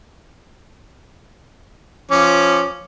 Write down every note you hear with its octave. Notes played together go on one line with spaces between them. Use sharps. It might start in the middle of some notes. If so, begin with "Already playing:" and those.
F3 C#4 D6